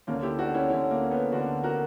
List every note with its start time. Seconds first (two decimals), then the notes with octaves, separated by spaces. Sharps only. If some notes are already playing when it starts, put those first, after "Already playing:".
0.07 D2 D3 A#3 C#4
0.22 E4 G4
0.39 D4 F#4
0.49 D4
0.54 C#4 E4
0.70 D2 D3 C#4 E4
0.91 A#3
1.02 C#4
1.11 B3
1.32 D2 D3 D4 F#4
1.64 F#4 A#4